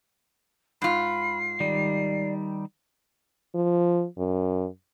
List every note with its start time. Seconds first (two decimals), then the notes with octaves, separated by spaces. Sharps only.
0.82 G#2 F4 B5 C7
1.60 D#3 G3 D5
3.54 F3
4.18 F#2